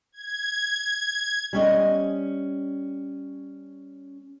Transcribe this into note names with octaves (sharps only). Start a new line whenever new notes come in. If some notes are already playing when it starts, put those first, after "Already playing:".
G#6
G3 C#4 D#5